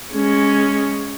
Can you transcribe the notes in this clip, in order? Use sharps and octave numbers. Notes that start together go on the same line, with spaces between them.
G#3 C#4